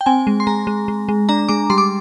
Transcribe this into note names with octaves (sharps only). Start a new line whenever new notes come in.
G5
C4 G#5
G#3
C6
G#3 A#5
G#3
G#3
G#3
D4 A#5
G#3 D6
G3 C6
D6